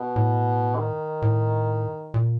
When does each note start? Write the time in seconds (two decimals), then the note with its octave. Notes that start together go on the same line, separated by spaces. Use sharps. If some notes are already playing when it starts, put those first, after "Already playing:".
Already playing: B2
0.16 A2
0.77 D#3
1.22 A2
2.14 A#2